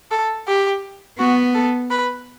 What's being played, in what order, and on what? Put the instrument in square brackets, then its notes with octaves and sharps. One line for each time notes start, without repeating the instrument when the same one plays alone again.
[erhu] A4
G4
[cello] B3 [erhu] F#4
[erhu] A4
B4